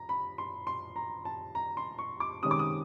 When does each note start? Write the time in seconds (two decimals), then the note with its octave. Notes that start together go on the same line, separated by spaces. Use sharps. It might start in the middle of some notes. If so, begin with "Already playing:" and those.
Already playing: A#5
0.09 B5
0.38 C6
0.67 C6
0.96 A#5
1.25 A5
1.55 A#5
1.77 C6
1.99 C#6
2.20 D6
2.43 C3 D#3 G#3 C#4 D#6
2.51 D6
2.59 D#6